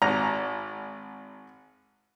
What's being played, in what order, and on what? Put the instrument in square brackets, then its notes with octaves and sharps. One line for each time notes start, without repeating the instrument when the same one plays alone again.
[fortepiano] G#1 A#5